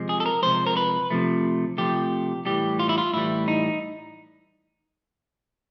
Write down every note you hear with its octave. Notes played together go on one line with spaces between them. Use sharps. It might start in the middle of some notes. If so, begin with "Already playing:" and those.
Already playing: C3 F3 G#3
G#4
A4
A#4
C3 F3 G#3 C5
A#4
B4
C3 F3 A3
C3 F3 A3 G4
A2 E3 G3 G4
F4
E4
F4
A2 E3 G3 E4
D#4